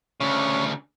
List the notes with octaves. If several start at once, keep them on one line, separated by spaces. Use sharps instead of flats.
D2 C#3 C#4